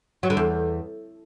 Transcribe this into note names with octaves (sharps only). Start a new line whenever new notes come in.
F#3
D3
E2